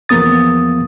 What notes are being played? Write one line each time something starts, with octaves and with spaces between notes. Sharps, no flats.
E2 F3 A#3 B3 D#6 A6